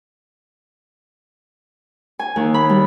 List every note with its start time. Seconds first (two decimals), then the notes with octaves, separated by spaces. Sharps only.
2.19 G#5
2.36 D#2
2.54 B5
2.69 G3